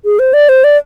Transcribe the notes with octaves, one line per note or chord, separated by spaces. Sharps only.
G#4
C5
D5
C5
D5